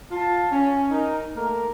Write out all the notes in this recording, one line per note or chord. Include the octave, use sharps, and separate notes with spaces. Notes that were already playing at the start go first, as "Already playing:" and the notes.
F4 A5
C#4
D#4 A#4
A3 A#3 A#4